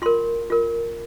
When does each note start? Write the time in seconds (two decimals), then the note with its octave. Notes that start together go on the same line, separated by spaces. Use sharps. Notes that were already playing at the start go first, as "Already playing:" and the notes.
0.02 F4 A#4 C6
0.50 F4 A#4